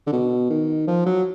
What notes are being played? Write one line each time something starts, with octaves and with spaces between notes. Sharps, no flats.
D3
B2
D#3
F3
F#3